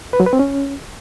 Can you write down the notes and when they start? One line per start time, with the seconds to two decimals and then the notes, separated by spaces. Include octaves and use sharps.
0.13 B4
0.20 F#3
0.26 B4
0.33 C4
0.39 C#4